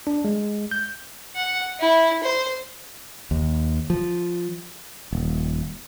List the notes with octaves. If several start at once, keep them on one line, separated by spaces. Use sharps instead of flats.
D4
G#3
G6
F#5
E4
C5
D#2
F3
D#1